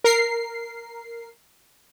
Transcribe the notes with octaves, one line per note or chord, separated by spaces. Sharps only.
A#4 C7